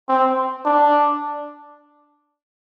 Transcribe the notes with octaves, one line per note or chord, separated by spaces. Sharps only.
C4
D4